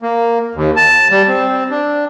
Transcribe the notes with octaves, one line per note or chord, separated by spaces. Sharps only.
A#3
D#2
A5
G3
C4
D4